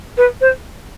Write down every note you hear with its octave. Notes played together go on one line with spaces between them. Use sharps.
B4
C5